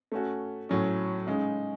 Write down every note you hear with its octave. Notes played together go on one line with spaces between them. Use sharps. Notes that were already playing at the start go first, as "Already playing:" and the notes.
A3 C#4 F#4
A2 F#3 C#4
C#3 G#3 D#4